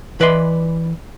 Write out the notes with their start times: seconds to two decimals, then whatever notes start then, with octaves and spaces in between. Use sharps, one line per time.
0.20 E3 B4 D5 D#5 G#5 C6